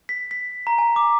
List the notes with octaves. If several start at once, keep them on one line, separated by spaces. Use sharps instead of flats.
B6
B6
A#5
G#5
D6